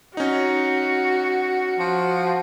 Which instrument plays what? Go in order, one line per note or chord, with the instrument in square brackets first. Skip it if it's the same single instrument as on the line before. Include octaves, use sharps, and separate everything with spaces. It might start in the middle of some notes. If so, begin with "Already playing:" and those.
[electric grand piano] C#4 D#4 [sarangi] F#4
[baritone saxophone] F3